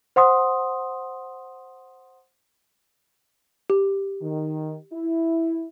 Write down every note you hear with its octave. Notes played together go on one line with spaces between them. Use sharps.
C5 F#5 C6 D#6
G4
D#3
E4